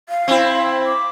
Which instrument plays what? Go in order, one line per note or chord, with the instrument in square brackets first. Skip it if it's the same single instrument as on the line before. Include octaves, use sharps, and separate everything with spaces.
[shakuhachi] F5
[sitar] C4 E4
[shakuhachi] D6